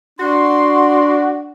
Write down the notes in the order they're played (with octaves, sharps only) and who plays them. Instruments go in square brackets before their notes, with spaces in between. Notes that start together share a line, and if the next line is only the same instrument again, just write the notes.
[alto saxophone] D4 [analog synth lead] F#4 [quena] C6